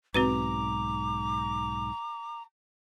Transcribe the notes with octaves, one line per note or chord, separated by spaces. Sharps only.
B1 G#2 C4 F#4 B4 A#5 D6